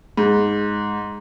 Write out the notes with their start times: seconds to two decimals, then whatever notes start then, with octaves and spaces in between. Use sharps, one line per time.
0.17 G#2